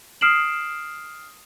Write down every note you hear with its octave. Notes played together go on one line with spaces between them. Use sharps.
D#6 F6 C7 D7 E7 F#7